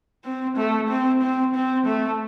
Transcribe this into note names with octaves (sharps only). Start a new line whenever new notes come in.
C4
A3
C4
C4
C4
A3